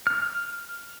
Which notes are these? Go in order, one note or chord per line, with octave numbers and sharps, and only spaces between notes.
F6